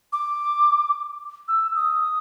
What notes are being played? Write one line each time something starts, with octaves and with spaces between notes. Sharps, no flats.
D6
E6
D#6